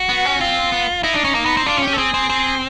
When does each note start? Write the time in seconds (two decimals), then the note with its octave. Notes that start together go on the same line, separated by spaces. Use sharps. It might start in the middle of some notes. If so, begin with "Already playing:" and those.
Already playing: F#4
0.09 B3
0.25 C#4
0.41 C4 F4
0.72 B3
1.03 D#4 E4
1.14 D4
1.24 C#4
1.35 A#3
1.45 B3
1.57 C4
1.66 D4 F4
1.77 C#4
1.82 G4
1.87 C#4
1.93 A4
1.98 C4 G#4
2.14 C4
2.30 C4